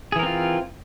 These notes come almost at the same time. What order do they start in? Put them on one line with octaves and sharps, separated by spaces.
G#4 E3 A#4 C4 F4